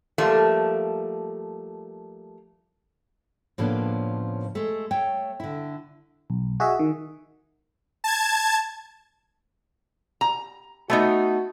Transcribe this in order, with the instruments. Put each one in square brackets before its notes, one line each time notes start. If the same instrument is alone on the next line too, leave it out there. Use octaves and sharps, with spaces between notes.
[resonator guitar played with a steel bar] F3 G3 A3 A#3
[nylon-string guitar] A2 C#3 F3 A#3 B3 D4
G#3 A3
A3 C#5 G5
D3 E4
[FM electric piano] B1
F#4 G#4 D#5 E5
D#3
[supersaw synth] A5 G#6
[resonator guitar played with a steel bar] A#5
[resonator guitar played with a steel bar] A3 B3 D#4 [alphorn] F#4